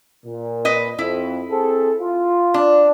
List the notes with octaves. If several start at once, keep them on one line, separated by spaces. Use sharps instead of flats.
A#2
B4 D#5
F2 E4
C4 G#4 A4
F4
D4